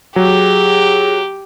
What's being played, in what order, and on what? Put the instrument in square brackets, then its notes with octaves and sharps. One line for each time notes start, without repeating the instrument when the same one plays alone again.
[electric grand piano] F#3 [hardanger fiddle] G4 [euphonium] G#4